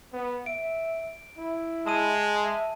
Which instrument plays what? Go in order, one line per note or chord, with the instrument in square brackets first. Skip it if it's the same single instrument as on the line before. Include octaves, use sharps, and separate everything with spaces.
[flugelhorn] B3
[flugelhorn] E5 [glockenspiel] D7
[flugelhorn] E4
[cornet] G#3 [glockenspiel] A5 D#6 D#7
[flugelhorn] E5